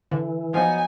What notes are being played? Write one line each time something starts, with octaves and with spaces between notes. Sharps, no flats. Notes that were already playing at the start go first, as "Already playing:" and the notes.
D3 E3
F3 F#3 B3 D#4 G#5